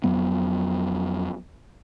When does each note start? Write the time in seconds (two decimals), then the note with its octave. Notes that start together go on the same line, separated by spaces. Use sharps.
0.04 F2 F#3 B3